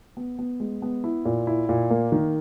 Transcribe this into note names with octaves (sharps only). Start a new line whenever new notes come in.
B3
B3
G#3
B3
E4
A#2
E4
A#2
A#3
D#3